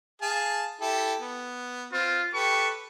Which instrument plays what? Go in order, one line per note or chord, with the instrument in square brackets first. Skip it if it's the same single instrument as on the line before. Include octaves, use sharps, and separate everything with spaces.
[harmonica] G#4 F5 A5
E4 G4 A4
B3
[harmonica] C4 [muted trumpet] F4
[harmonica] G4 A4 B4 [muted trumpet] C#6